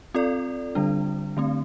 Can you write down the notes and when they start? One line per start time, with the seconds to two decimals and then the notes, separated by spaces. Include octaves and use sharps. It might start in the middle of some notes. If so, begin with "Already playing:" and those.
0.14 C4 F4 A4 D5
0.75 D3 G3 D4
1.37 D3 A3 C4